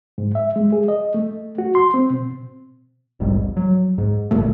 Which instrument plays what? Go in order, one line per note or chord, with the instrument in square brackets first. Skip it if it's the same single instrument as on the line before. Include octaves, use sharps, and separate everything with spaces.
[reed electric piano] G#2
E5
G#3
G#4
D#5
A3
F#4
C6
C4
B2
[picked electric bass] E1 A#1 G#2 G3
F#3
G#2
G1 D2 A#2 A3